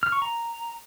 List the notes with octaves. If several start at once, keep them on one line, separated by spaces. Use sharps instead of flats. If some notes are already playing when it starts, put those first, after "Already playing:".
F6
C#6
A#5